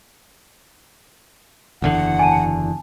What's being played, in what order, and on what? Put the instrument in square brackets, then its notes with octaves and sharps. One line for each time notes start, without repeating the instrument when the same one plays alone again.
[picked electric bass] F#1 E2 D3 [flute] F#5
[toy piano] G#5 A5